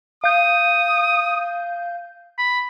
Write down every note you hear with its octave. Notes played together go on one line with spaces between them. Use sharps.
F5 D#6 G6
B5